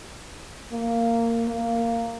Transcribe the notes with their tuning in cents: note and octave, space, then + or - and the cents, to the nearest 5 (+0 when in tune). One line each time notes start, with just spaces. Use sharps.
A#3 -15
A#3 -10